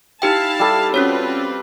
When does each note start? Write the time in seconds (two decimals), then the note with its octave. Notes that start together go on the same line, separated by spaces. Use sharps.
0.22 D#4 E4 G4 F5 G5 A5
0.59 G3 A4
0.94 C4 C#4 F4 F#4 B4 C#5